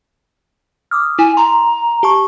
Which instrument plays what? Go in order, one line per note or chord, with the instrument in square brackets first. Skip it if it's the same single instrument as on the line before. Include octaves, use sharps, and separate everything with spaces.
[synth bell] D6 D#6 F6
[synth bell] E4 [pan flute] G#5
[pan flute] A#5 [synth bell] C6
[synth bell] G4 A5 C#6